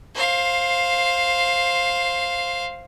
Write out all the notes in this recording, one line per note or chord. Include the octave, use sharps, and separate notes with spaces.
C5 F5